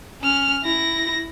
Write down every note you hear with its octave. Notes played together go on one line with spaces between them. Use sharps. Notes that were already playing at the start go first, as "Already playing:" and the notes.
C#4 F6
E4 A#6